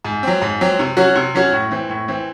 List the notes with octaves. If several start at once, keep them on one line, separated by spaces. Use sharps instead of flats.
G#2
F#3 C4
G#2
F#3 C4
C3
F#3 C#4 F#4
C3
F#3 C#4 F#4
A2
E3 C4
A2
E3 C4